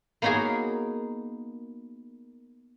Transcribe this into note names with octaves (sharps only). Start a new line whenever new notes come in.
A#3 B3 D#4 F#4 G#4 A#4